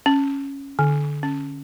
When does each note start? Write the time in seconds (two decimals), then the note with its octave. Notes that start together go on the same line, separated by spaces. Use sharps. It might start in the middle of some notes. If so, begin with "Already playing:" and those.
0.06 C#4
0.79 D3
1.23 C#4